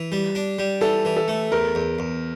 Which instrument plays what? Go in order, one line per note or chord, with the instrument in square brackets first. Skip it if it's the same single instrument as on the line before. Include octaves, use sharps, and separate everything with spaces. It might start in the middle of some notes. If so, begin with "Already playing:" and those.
Already playing: [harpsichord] E3
G3
D4
G3
[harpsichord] E3 [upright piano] A4
[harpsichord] E3
[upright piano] A4
[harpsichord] A3
[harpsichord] E2 [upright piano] A#4
[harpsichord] E2
E2